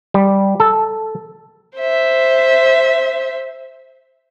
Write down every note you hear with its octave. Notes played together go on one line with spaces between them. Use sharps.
G3
A4
C5 E5